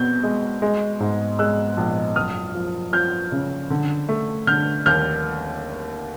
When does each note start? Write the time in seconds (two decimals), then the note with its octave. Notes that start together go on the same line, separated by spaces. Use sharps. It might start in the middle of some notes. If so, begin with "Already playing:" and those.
Already playing: B2 C4 G6
0.23 G#3
0.62 G#3
1.00 G#2
1.39 G#3 E6 F#6
1.77 A#1
2.16 F#1 D#6 F6
2.55 F3
2.93 F3 F6 G6
3.32 C#3
3.70 D3
4.09 A3
4.47 D3 F6 G6
4.86 D#2 F6 G6